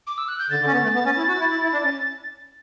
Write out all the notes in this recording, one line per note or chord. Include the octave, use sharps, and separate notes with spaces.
D6
E6
F#6
G6
D3 A6
D3
C#4
B3
A3
B3
C#4
E4
F#4
E4
E4
E4
D4
C#4